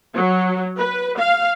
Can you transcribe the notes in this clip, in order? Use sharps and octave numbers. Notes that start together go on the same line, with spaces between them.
F#3
B4
F5